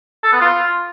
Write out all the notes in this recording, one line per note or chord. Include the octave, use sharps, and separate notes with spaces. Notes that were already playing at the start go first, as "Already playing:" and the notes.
A4
B3
F4